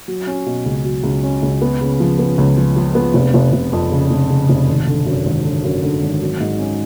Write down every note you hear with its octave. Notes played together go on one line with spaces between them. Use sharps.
F#3
C#4
B2
C#2
F#3
C#2
C#4
C#2
B3
C#3
F3
B3
C#2
F3
F3
B3
F1
F1
F1
F2
C#3
F1
C#3
F1
G#1
D3
F#2
G#1
D3
F#2
D3
G#1
F#3
G#2
C#4